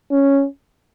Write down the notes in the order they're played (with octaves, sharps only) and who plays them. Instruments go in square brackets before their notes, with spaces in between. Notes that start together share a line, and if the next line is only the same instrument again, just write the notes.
[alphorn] C#4